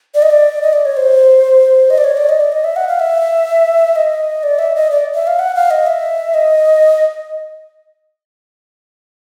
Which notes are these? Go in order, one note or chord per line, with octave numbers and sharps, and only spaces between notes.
D5
D#5
D5
D#5
D5
C#5
C5
D#5
D5
C#5
D5
D#5
D5
D#5
E5
F#5
F5
E5
D#5
D5
E5
D#5
D5
E5
F5
F#5
F5
D#5
E5
D#5